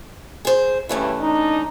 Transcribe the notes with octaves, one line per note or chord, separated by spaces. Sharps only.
G#4 C5
G2 C#3 E3 A3 C#4 E4
D4 D#4